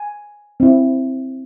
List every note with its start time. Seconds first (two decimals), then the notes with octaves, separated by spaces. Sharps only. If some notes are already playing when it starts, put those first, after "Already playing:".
Already playing: G#5
0.60 C4 E4